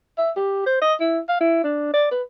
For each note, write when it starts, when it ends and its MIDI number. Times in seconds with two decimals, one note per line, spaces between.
0.18 0.30 76
0.37 0.63 67
0.66 0.79 72
0.81 0.94 75
1.00 1.19 64
1.29 1.37 77
1.40 1.61 64
1.64 1.89 62
1.94 2.08 74
2.11 2.22 71